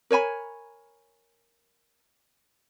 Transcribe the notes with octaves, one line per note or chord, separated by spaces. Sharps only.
A#4 C#5 G#5 B5